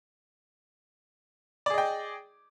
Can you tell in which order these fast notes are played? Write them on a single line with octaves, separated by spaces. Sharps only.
D5 G#4 D#5 G5